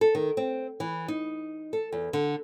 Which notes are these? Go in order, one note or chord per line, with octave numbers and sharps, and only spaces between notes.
A4
D#3
C4
E3
D#4
A4
E2
D3